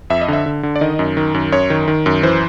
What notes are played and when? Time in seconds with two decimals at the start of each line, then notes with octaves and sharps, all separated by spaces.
0.10 F2 E5
0.21 D#5
0.28 D3 E5
0.46 D3
0.63 D3
0.76 D5
0.81 D#3 D#5
0.99 F#2
1.17 D#3
1.34 F#2
1.52 F#2 C#5
1.70 D#3
1.88 D#3
2.06 F#2
2.23 E3 C5